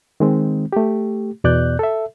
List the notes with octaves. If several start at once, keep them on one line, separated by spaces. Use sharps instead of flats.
D#3 G#3 C4
A3 G4
E2 B2 D5 F#6 G6
A4 E5